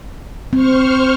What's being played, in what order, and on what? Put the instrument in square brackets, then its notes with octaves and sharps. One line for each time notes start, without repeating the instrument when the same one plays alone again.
[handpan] C4 [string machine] C5 C#6 F6